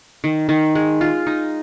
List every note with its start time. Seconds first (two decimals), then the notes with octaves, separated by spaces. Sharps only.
0.24 D#3
0.49 D#3
0.75 G#3
1.01 F4
1.27 D#4